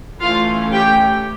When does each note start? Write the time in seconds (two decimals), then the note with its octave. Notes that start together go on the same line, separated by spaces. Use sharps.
0.20 E3 A3 C#4 F4 F5
0.73 G4 G5